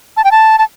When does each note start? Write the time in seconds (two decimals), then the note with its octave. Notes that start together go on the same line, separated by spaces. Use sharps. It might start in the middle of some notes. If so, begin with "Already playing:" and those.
0.17 A5
0.24 G5
0.31 A5
0.58 A5